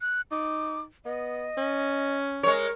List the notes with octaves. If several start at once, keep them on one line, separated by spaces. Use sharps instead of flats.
F#6
D#4 D6
B3 D#5
C#4
G#3 A#4 C#5